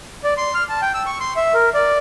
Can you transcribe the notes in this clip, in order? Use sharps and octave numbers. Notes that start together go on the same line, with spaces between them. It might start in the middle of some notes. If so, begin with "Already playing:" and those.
D5
C6
F6
A5
G5
E6
C#6
C6
E5
A#4
D5